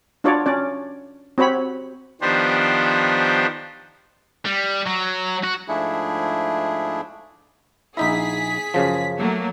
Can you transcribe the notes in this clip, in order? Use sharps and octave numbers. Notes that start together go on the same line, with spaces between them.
D4 F4 F#4 C#5 D5
C#4 D5
C4 F#4 C#5 B5
D#3 F3 B3 D4 G4 C5
G3
F#3
F#4
G#2 F3 A3 D4 E4 G#4
A#1 D#4 E4 G#4 B6
F#2 C#3 F3
F#3 A3 A#3